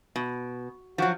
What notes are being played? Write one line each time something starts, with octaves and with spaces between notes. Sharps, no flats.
B2
F3 F#3 F#4